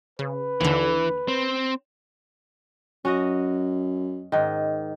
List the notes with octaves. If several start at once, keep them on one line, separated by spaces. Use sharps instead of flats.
C#3 B4
D#2 D3 E3
C4
F#2 C#4 F#4 D#5
G#2 D#3